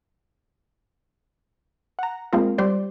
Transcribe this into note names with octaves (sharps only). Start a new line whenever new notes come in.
F#5 A#5
G#3 A#3 C4 F4 A#4
G3 C5 D5